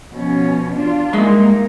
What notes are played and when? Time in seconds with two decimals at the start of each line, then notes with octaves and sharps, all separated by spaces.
0.14 B2 F3 C#4
0.77 D4 F4
1.13 G3 G#3 A#3 D#4 E5 C6